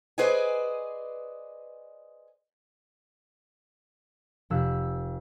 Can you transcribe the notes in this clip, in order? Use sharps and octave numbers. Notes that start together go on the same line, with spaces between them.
G#4 B4 C5 D5 D#5 G#5
F1 E6 F#6 B6